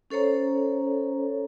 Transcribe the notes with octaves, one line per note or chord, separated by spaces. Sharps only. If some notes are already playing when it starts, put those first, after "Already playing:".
C#4 A4 C5 C#5 A#5